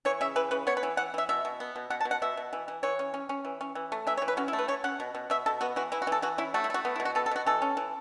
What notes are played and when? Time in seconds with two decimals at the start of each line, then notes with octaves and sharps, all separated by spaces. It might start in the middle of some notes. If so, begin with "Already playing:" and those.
0.05 E3 C#5
0.21 C#3 E5
0.36 E3 B4
0.51 C#3 B4
0.67 B3 C#5
0.77 B4
0.83 E3
0.97 E3 F#5
1.14 E3 E5
1.29 B2 E5
1.45 B2
1.60 B3
1.76 B2
1.90 B2 F#5
2.00 A5
2.05 B2
2.11 F#5
2.22 B2 E5
2.37 B2
2.53 E3
2.68 E3
2.83 E3 C#5
2.99 C#4
3.14 C#4
3.29 C#4
3.45 E3
3.61 C#4
3.75 E3
3.92 A3
4.07 E3 E5
4.17 C#5
4.22 E3
4.28 B4
4.37 C#4 F#4
4.48 E4
4.53 A3
4.59 B4
4.68 C#4 C#5
4.84 C#4 F#5
5.00 B2
5.15 B2
5.30 B2 E5
5.46 B2 A4
5.61 B3 F#4
5.76 E3 F#4
5.92 E3 E4
6.02 F#4
6.07 E3 A4
6.22 E3 F#4
6.38 C#4 E4
6.54 A3 F#4
6.64 E4
6.70 A3 F#4
6.85 B3
6.96 E4
7.00 B2
7.05 F#4
7.15 B3 A4
7.26 A4
7.31 B2 F#4
7.46 E3 A4
7.62 C#4
7.77 E3